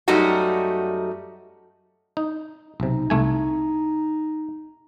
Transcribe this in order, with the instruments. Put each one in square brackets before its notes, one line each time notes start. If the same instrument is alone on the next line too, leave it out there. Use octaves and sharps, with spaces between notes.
[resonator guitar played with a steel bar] F#2 G3 A3 D#4 F#4
[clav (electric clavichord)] D#4
[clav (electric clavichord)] B1 C3 [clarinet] D#4
[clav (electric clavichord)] C2 A3 G#5